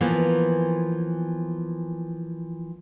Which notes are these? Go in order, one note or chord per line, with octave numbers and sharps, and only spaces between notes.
E3 F3 A#3 B3